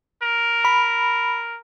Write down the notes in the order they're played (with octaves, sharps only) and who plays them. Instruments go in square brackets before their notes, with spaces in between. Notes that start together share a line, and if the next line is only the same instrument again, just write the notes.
[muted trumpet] A#4
[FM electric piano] B5